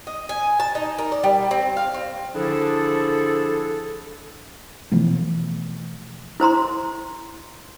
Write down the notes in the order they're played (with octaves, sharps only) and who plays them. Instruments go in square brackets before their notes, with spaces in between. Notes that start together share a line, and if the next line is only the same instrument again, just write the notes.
[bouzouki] D#5
G#5
A5
D#4
A#4
D5
G3
C4
F5
C4
[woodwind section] D3 F3 D4 E4 G#4 A4
[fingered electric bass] B2 E3 F3 A3
[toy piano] E4 C5 A#5 C6